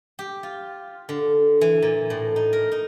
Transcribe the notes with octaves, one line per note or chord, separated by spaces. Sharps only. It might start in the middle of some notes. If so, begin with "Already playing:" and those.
G4
F4
D3
E3
A#2
A2
D#4
A#4
D#4